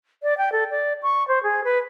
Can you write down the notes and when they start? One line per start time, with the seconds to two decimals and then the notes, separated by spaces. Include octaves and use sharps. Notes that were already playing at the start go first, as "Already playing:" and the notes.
0.23 D5
0.38 G5
0.52 A4
0.70 D5
1.03 C#6
1.28 C5
1.43 G#4
1.64 B4